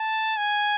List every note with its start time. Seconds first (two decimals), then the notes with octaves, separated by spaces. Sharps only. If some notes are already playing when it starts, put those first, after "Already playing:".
Already playing: A5
0.37 G#5